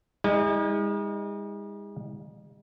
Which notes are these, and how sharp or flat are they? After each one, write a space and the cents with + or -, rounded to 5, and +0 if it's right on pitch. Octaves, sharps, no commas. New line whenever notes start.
G#3 -40 D#4 +45